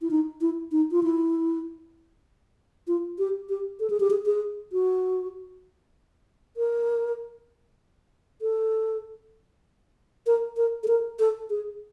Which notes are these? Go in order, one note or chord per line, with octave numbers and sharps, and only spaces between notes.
E4
D#4
E4
D#4
F4
E4
F4
G4
G4
A4
G#4
G4
G#4
G#4
F#4
A#4
A4
A#4
A#4
A4
A#4
A4
G#4